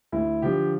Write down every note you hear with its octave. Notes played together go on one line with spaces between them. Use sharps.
D2 E4
D3 F3 G4